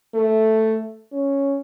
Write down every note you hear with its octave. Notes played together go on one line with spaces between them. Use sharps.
A3
C#4